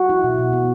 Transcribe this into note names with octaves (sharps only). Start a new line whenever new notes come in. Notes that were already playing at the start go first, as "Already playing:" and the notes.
Already playing: F#4
E4
B2
B2
B3